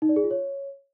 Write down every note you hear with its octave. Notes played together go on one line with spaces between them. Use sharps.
D#4
D5
G#4
F4
C#5